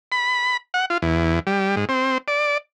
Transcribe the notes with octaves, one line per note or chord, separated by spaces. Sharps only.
B5
F#5
F4
E2
G3
G#2
C4
D5